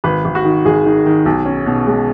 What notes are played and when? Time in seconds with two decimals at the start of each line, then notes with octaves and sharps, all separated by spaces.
0.04 G#1 B4
0.25 G#1
0.35 F#4
0.44 D#3
0.65 G#1 G#4
0.85 D#3
1.06 D#3
1.26 B1
1.45 C#4
1.66 B2
1.87 G#3